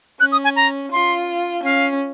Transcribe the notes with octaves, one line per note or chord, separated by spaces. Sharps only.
C#4 F#6
D#6
G#5
A#5
F4 C6
C#4 F5